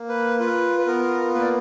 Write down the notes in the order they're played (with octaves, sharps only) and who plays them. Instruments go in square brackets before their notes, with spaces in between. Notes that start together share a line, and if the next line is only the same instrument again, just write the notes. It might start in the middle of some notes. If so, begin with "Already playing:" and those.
Already playing: [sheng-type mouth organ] A#3
B4
F4 B4
B4
B3 A#4
A#3 B4
D5